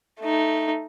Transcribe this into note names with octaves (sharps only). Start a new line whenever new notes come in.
A3 D#4